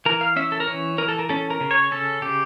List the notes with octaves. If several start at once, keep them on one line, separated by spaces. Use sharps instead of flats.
E3 A#4
F5
C#4 E5
A4
A#4
E3 C#5
E3 A#4
A4
A#4
C#4 A4
A#4
C#3
C#5
C#4 A4
C#3 G4